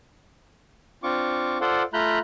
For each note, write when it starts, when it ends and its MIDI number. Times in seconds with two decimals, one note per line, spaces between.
1.03 1.58 60
1.03 1.58 62
1.03 1.58 65
1.03 1.58 85
1.03 1.58 86
1.61 1.83 65
1.61 1.83 69
1.61 1.83 72
1.61 1.83 74
1.61 1.83 78
1.93 2.19 57
1.93 2.19 65
1.93 2.19 82
1.93 2.19 83
1.93 2.19 90
1.93 2.19 91